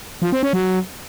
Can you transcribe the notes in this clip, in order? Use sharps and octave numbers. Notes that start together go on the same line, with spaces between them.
F3
C4
C#4
F#3